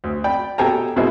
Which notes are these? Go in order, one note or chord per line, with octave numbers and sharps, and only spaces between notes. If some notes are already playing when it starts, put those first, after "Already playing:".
D2
D5 G5 B5
B2 G4 A4 G5 G#5 A#5
A#1 B2 G#3 A#3 E4 C5